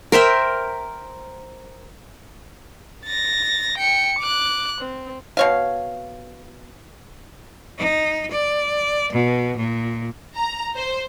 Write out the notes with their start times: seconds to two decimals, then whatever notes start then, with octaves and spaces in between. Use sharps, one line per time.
0.12 A#4 C5 E5 G5
3.05 A6 A#6
3.78 G5 C#7
4.19 D6 F#6
4.81 C4
5.37 B2 C#5 F5
7.78 D#4
8.31 D5
9.13 B2
9.57 A#2
10.36 A#5
10.76 C5